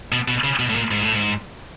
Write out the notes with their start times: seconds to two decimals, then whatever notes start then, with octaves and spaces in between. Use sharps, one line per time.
0.12 B2
0.28 B2
0.44 C#3
0.59 B2
0.69 A2
0.75 A#2
0.91 G#2
1.01 A2
1.13 G#2